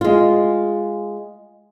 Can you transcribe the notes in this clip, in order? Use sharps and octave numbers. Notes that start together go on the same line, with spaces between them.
G#3 F4